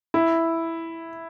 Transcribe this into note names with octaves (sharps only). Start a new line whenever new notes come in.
E4